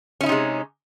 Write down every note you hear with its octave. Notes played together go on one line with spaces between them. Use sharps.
C3 G#3 C#4 D#4 E4